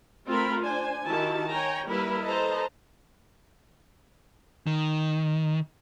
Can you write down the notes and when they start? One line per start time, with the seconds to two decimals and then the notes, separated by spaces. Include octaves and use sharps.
0.28 A3 C4 F4 A#4 B5
0.63 D4 C5 G#5
1.06 D#3 E4 F#4 G4 A5
1.49 C#5 G5 G#5 A#5
1.88 G3 A#3 E4 A#4 B4 B5
2.25 A4 B4 C5 D#5 A5 A#5
4.67 D#3